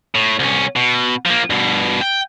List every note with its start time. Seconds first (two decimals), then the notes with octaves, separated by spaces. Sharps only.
0.15 A2
0.39 C2 C#4
0.76 B2
1.26 F3 A#3
1.50 G2 B2
2.01 G5